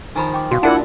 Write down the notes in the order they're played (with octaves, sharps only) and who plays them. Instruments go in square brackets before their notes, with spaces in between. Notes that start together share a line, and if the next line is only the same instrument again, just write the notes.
[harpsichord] D#3 F3 [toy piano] G#5 A#5 B5
[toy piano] G5 D6
[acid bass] B2 [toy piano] F#4 F5 D#6
[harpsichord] A#2 [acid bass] D4 [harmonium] E4 F#5 [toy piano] F4 A#4 A5